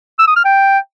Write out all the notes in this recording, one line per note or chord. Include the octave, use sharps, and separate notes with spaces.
E6
D#6
F6
G5